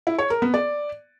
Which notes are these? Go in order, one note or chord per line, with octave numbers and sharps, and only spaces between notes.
E4
C#5
A#4
B3
D5